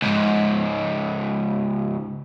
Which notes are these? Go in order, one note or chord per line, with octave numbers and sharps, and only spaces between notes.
C#2 G#2